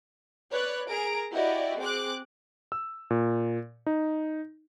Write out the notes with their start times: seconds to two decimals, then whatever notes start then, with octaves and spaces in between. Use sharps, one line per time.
0.52 B4 C#5 D5 F#6
0.88 G#4 A#4 A#5 D7
1.33 E4 F#4 G4 D5 D#5
1.80 C4 G#4 D6 F#6
2.72 E6
3.10 A#2
3.87 D#4